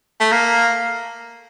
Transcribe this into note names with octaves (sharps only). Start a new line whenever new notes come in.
A3
A#3